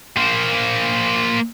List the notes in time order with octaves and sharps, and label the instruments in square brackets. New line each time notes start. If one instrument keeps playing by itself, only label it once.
[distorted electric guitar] A#3 C5